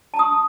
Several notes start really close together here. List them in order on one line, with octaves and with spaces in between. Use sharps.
A5 A#5 D#6 C#6